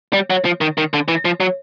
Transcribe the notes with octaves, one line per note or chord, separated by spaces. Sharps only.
G3
F#3
F3
D#3
D#3
D3
E3
F3
F#3